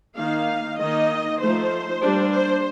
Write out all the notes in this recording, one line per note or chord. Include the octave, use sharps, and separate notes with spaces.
D#3 A#3 D#4 F5
D#3 A#3 D#4 D#5
F3 A3 D#4 C5
G3 A#3 D4
C5